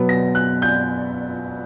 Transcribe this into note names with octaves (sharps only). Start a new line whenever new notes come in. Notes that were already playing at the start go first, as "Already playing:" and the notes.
Already playing: B2 F#3 B3
A#6
F#6
G6